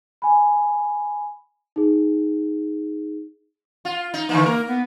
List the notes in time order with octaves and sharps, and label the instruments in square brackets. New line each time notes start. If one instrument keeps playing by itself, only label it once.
[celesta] G#5 B5
D#4 G#4
[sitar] F4
D#4
[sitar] D3 E3 A#3 [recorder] D#4
[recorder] A#3 [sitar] A#4
[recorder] B3